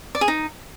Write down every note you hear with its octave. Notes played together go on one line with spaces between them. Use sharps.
D5
G#4
D#4